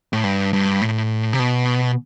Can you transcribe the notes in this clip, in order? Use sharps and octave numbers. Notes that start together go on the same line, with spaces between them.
A2
G2
G2
A2
C3
B2